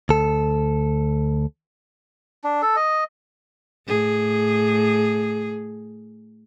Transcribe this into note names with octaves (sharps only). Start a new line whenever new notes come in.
D2 A4
D4
A4
D#5
A2 G#4